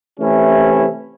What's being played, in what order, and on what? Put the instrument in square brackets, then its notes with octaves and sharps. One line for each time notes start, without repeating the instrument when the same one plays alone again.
[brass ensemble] C3 E3 A3 C#4 E4